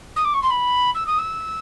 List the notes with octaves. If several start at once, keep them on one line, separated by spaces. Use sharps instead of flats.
D#6
D6
C#6
C6
B5
E6
D#6
E6